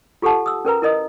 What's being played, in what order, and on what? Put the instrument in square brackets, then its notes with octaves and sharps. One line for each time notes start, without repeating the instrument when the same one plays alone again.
[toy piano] F4 G4 A4 F#5 A5
D#6 E6
C#4 A#4 B4 A#5
E4 A#4 D#5 D#6